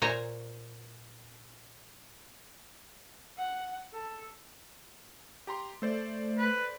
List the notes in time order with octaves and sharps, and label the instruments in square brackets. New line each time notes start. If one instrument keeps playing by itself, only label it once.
[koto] A#2 C5 C#5 G#5 A#5
[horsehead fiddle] F#5
A4
[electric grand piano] G4 A#5 C6
[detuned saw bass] A3 [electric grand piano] A4 C5 D5
[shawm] B4